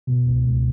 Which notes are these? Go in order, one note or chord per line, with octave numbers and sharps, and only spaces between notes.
B2
C#2
C#2